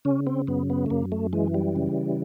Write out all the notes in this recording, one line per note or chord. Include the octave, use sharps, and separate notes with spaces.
C#3 C#4
C4
F#2 B3
B3
A3
F#2 A#3
A3
E3 G#3
G3
C#3